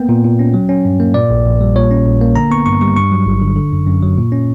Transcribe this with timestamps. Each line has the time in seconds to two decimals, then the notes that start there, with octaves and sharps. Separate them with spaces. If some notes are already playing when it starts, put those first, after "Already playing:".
Already playing: A#3 B3 G5
0.09 A#2
0.24 A#2
0.39 C#4
0.54 F#3
0.69 C#4
0.85 G2
1.00 A#3
1.14 A#2 D5
1.31 A#1
1.46 A#1
1.61 G3
1.75 A#2 C#5
1.91 C#4
2.06 A#1
2.21 A#3
2.35 D3 A#5
2.51 B3 C#6
2.66 G2 C#6
2.81 G3 C#6
2.96 G2 C#6
3.12 F#3
3.26 G1
3.42 D3
3.56 D3
3.73 F#2
3.87 F#2
4.02 F#3
4.17 A#2
4.32 C#4